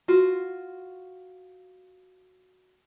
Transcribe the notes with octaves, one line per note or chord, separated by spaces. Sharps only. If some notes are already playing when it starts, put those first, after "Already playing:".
F4 F#4